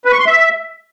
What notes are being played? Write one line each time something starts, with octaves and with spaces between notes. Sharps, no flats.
B4
C#6
C6
E5